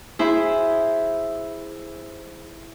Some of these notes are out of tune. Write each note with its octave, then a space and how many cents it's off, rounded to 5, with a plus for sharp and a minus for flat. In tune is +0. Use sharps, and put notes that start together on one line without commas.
E4 +0 G#4 -5 C5 -5